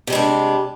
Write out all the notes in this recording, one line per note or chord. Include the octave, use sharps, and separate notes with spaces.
C3 G3 G#3 D4